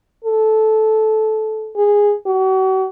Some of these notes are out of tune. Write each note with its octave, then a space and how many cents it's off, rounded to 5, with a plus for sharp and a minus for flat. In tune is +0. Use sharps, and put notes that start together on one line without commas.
A4 -15
G#4 -10
F#4 +40